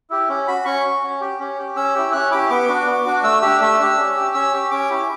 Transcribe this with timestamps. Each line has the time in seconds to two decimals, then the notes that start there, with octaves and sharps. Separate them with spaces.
0.10 E4 G4
0.29 C#4
0.47 F#4 B5
0.65 C#4 C#6
0.84 F#4
1.03 C#4
1.21 G4
1.40 C#4
1.58 G4
1.76 C#4 E6
1.95 E4 G4
2.13 C#4 F#6
2.31 E4 G4 D6
2.50 B3 D6
2.69 D4 F#4
2.86 B3
3.06 D4 F#4
3.24 A3 E6
3.42 D4 G4 E6
3.61 A3 E6
3.79 D4 G4
3.98 C#4
4.16 G4
4.34 C#4 E6
4.53 G4
4.71 C#4 D6
4.90 E4 G4